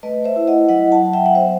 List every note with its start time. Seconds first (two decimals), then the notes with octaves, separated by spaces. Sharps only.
0.03 A3 B4 D#5
0.24 C5 E5
0.36 E4
0.47 D#5 F#5
0.69 F#3 D#5 F#5
0.92 F#5 A5
1.03 F#3
1.13 E5 G5
1.26 F#5
1.35 B3 C5 E5